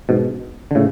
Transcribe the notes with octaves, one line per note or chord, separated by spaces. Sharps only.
G#2 B2
D3
A2 C#3